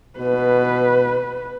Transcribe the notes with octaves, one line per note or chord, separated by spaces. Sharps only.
B2 B4